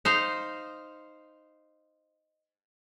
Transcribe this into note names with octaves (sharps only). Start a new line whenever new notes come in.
D#4 C5 F5